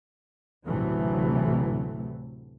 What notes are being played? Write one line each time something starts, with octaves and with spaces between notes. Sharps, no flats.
A1 D2 C3 E3 F#3 A3